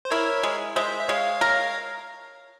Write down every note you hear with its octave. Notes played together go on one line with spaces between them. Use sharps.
C5
E4 A#4 C#5
G#3
G#3 C5 E5
E5
G#3 C#5 F5
A#4